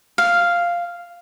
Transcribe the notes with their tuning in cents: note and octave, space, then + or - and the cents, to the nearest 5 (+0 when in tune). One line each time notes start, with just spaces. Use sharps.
F5 -5